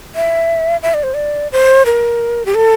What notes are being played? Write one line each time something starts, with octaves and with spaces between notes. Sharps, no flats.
E5
E5
D5
C5
D5
C5
A#4
G4
A4